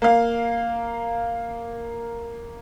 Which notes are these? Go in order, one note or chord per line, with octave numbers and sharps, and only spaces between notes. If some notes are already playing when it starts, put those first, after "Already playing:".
A#3 F5